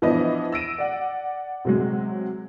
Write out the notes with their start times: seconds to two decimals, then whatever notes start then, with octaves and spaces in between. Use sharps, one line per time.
0.02 E3 F3 B3 D4 E4 D#5
0.52 E6 A#6 D7 D#7
0.78 D5 F#5
1.65 C3 F#3 G#3